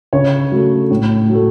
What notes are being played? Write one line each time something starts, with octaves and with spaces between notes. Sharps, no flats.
C#3 C#5
F#3 A3
A2
F#3 A3